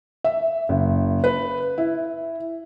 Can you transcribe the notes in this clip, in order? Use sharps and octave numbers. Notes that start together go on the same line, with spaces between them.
E5
F#1
B4
E4